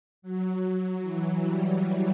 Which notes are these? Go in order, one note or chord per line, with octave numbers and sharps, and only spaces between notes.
F#3
E3
G3